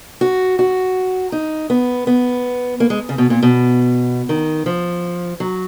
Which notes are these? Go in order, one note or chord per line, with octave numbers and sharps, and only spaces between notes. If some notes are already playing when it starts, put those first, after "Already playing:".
F#4
F#4
D#4
B3
B3
A#3
G#3
C#3
B2
A#2
B2
D#3
F3
F#3